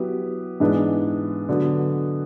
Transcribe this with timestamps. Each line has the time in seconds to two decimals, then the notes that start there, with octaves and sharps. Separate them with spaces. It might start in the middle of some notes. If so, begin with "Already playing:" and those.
Already playing: F#3 B3 E4 G4
0.60 G#2 E3 G#3 B3 D4
1.49 D3 F#3 B3